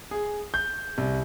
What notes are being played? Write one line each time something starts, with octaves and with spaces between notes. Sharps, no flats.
G#4
G6
C2